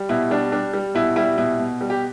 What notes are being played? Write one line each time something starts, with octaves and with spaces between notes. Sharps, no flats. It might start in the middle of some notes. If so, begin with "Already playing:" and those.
Already playing: G3
B2 E4
G3 D4
G3 D4
G3
B2 E4
G3 E4
B2 E4
B2
G3
G4